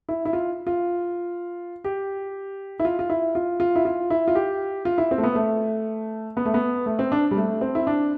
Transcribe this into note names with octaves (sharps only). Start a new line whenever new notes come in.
E4
E4
F4
F4
G4
E4
F4
F4
E4
F4
F4
E4
F4
E4
F4
G4
F4
E4
C4
A3
B3
A3
B3
A3
B3
A3
C4
D4
G3
A3
C4
E4
D4